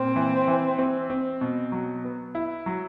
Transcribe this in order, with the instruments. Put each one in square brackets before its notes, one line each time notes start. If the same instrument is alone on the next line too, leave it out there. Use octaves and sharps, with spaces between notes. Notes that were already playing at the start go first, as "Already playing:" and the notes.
Already playing: [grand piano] A#2 [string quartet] C4
[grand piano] E3
E3
C4
C4
B2
F#3
B3
E4
F#3